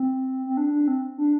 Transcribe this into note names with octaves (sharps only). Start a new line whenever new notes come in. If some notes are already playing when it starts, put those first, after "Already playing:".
Already playing: C4
C4
D4
D4
C4
D4